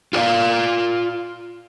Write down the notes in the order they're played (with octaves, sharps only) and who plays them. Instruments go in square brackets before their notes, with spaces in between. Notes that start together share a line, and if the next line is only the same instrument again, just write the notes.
[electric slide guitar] F4 F#4 C#5 D5 F5